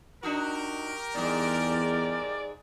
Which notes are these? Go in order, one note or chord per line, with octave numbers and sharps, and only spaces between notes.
D4 D#4 F#4 G4 A#4
E2 G#2 G3 D5